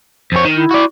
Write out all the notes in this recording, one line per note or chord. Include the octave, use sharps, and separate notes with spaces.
F2 C5 C#5
D#3
E4
F#4 D5